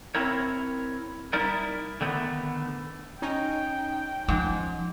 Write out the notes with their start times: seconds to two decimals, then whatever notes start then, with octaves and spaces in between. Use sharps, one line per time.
0.15 C4 E4 A#4 C#5
1.33 G3 D#4 E4 A#4 D5
2.01 D3 D#3 A3 B3
3.22 C#4 D#4 G5
4.28 G#2 F3